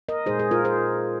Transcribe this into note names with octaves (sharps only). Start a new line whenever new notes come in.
A#4 D#5
A#2 G#3 D#4 G#4 C5
G#4
F4 A#4
G#4 C5